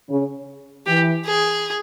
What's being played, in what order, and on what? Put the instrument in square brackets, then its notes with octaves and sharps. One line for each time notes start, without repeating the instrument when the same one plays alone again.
[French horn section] C#3
[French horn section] E3 [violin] G4
[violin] G#4